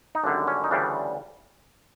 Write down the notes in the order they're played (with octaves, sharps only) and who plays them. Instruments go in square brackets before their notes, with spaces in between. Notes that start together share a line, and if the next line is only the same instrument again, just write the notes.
[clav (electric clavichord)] D#4
G#1 F#2 D3 G3 D4
C#4
D#4
D2 C#3 E3 G3 D4